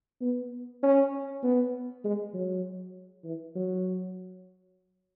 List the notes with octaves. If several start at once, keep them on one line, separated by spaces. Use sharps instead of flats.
B3
C#4
B3
G#3
F#3
E3
F#3